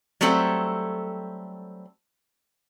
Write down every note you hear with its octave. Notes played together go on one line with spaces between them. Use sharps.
F#3 G3 A3 C4 A4 C5